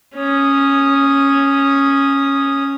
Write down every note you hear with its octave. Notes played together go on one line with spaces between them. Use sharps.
C#4 D#6